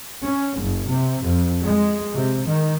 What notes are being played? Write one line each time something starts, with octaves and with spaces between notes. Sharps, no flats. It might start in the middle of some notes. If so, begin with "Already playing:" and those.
C#4
F#1
C3
F2
G#3
C3
D#3